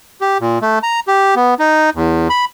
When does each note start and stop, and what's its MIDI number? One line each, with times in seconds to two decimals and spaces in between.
0.21 0.38 67
0.41 0.59 46
0.62 0.79 57
0.83 1.00 82
1.08 1.35 67
1.36 1.54 59
1.59 1.90 63
1.95 2.28 40
2.30 2.45 83